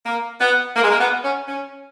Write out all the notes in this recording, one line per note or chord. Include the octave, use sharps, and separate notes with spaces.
A#3
B3
A#3
G#3
A#3
B3
C#4
C#4